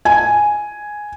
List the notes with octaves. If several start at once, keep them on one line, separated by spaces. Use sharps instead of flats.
G#5